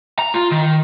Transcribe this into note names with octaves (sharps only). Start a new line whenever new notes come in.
A#5
F4
D#3